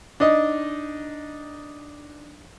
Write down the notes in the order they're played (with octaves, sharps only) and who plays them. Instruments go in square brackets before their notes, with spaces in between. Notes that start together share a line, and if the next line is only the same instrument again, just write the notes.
[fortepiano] D4 D#4 D#5